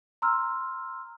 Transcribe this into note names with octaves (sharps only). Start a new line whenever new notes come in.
A#5 C6 E6 F6